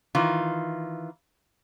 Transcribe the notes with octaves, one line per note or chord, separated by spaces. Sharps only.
D#3 E3 F4